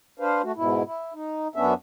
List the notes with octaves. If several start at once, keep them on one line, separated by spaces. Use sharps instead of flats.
D4 B4 C5 F5
A3 F#4
G#2 B2 E4
E4
D#4
F#2 B3 C#4 D4 E5